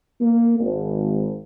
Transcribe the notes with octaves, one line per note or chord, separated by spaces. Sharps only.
A#3
G#1